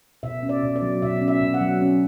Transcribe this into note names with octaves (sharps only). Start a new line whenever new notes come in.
B2 E5
C#4
D5
B2
D5
F#3
B2 E5
C#4
E5
B2
F#5
F#3
C#4